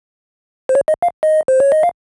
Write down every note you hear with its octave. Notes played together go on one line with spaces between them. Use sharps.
C5
C#5
D#5
F5
D#5
C5
C#5
D#5
F5